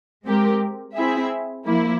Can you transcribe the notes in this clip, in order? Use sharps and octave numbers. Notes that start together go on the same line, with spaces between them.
G#3 C4 G4 A#4
C4 E4 G#4 E5
F3 A#3 E4